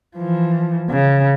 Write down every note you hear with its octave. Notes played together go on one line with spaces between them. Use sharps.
E3 F3
C#3